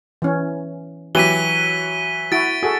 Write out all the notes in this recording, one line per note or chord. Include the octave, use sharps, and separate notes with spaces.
E3 C#4
E3 F#3 G4 B6 D#7 G7
E4 F#4 A6 D7
F#4 G#4 A4